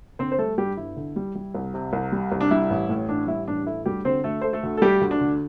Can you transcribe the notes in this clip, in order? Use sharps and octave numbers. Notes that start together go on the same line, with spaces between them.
D3 C4 C5
C5
G3 A3 A4
G2 G3 G4
G1 E4
D3
G3
G3
C2
C3
C2
G3
C2
D4
G3 E4
A1
A2
A1 D4
G3 E4
A1 D4
A3 E4
D2 G3 G4
D3 C4 C5
D2 A3 A4
A3 C5
A3 A4
D2
A4
G3 A3 G4
D2
D4
D3